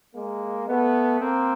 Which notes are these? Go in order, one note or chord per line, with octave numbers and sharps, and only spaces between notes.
G#3 A#3
A3 B3
A#3 C4